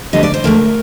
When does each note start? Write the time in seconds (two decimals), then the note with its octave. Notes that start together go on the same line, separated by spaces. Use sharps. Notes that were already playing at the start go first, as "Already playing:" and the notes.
0.13 D2 D3 G3 D#5
0.23 D5
0.34 C5
0.44 D2 D3 A3 A#4